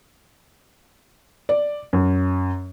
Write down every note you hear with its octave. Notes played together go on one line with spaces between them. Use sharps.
D5
F#2